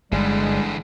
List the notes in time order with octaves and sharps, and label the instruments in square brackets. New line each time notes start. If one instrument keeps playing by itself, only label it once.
[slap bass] G1 [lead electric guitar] D3 E3 [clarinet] G3 [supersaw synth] G#3